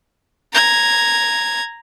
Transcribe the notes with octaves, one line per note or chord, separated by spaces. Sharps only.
A#5 G#6